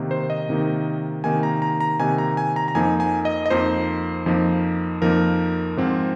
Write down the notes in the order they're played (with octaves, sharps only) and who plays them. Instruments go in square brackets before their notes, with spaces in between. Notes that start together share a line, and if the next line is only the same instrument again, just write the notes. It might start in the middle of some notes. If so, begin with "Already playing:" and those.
Already playing: [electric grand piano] C3 D#3 A#3 D#4
C5
D#5
C3 D#3 A#3 D#4
C3 D#3 A#3 D#4 G#5
A#5
A#5
A#5
C3 D#3 A#3 D#4 G#5
A#5
G#5
A#5
A#5
F2 F3 A#3 D#4 G#5
G#5
D#5
D#5
F2 F3 A#3 D#4 C5
F2 F3 A#3 D#4
F2 F3 A#3 D#4 A#4
G#2 F3 C4